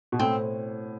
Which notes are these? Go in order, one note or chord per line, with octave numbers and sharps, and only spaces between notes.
B2
A2 C4